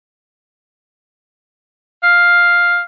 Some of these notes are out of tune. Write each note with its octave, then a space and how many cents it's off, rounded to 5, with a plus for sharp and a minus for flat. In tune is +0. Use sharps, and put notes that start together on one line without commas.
F5 +5